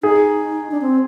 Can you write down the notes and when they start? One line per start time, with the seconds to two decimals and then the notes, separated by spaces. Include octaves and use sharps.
0.03 D#4 G#4
0.71 D4
0.81 C4